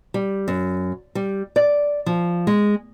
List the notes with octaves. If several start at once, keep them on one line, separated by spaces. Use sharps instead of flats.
G3
F#2
G3
D5
F3
G#3